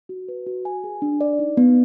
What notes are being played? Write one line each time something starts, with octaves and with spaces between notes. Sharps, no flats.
F#4
B4
F#4
G#5
G#4
D4
D5
D#4
B3